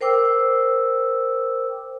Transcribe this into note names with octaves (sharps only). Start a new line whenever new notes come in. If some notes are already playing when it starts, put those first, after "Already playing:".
A#4 C5 G5 D6 E6